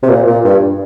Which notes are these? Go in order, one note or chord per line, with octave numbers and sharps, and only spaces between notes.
C3
A#2
A#2
G2